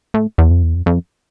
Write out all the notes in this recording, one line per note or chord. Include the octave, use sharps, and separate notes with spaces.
A2
E2
F2
E2
F2
F2